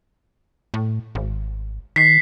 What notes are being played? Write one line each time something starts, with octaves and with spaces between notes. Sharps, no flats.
A2
G#1
D#3 B6 C7